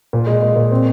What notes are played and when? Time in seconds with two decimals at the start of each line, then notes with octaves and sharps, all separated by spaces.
0.13 A#2
0.27 G#3
0.41 G#3
0.56 A#2
0.72 C4